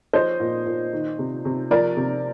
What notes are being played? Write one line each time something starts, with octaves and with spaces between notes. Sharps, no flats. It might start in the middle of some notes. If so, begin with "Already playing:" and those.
F3 C5 D#5
A#2
A#2
D#3
C3
C3
F3 A#4 D5
C3